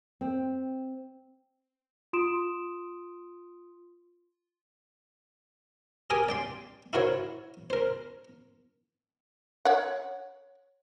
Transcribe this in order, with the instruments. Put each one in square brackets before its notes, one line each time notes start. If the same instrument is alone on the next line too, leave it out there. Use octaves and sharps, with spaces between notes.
[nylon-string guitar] C4
[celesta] F4 C6 D#6 D7 E7
[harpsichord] G4 G#4 A#4 G#5 D6 D#6
D5 G5 C6
E4 F#4 A#4 C5 C#5
A#4 C5
[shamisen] C#5 F#5